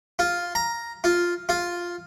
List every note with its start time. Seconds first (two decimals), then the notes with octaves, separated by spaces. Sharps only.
0.19 F4
0.55 A#5
1.04 F4
1.49 F4